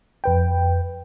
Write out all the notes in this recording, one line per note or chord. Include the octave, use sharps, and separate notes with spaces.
F2 B4 G5